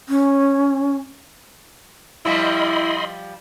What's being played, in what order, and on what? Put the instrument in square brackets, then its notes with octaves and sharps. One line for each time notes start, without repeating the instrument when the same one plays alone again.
[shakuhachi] C#4
[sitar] F3 G3 [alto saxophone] E4 [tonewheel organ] D#5 B5 C6